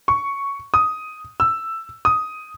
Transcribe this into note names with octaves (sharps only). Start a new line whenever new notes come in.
C#6
D#6
E6
D#6